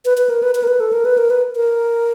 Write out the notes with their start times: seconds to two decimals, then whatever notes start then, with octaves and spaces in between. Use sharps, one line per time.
0.05 B4
0.18 B4
0.29 A#4
0.43 B4
0.55 B4
0.63 A#4
0.68 B4
0.80 A4
0.93 A#4
1.05 B4
1.18 A#4
1.30 B4
1.56 A#4